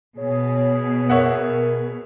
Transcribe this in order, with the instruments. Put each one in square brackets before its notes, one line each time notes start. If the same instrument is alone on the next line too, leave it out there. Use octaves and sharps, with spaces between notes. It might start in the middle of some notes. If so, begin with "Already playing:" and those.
[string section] B2 [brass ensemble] G#4 [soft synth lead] C#5
[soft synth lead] A#4 [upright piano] C#5 E5 F#5